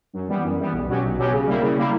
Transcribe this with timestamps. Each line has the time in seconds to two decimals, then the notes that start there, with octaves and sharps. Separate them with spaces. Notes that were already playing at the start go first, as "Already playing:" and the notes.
0.13 F#2
0.28 E3 G3 B3
0.43 F#2
0.58 E3 G3 B3
0.73 B1
0.88 B2 F#3 C#4 G4
1.03 B1
1.18 B2 F#3 C#4 G4
1.32 C#3
1.47 G3 A#3 E4
1.62 C#3
1.77 G3 A#3 E4